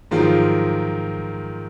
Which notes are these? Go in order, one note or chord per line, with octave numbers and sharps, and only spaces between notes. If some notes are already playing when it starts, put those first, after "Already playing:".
G#2 D#3 F3 F#3 G#3 F4